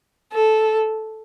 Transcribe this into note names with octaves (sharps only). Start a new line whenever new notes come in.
A4